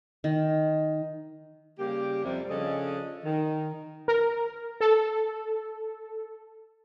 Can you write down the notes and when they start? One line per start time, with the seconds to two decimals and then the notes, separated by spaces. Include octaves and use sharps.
0.24 D#3
1.79 C#3 G3 A#3 G4
2.24 F2 C3 G3
2.50 C#3 F3 C#4 D4 A4 D#5
3.25 D#3
4.08 A#4
4.81 A4